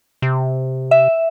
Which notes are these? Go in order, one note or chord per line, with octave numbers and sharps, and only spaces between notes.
C3
E5